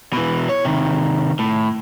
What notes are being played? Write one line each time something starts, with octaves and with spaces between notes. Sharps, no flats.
B2 E3
C#5
C3 D#3
A2